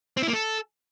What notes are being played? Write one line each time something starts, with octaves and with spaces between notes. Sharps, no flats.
C4
E4
A#3
A4